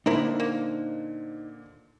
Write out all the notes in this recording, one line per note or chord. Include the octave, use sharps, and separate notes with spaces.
A#2 D3 D#4 E4 A#4 C5 B5
A#3